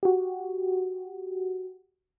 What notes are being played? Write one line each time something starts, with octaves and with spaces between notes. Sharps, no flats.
F#4 G4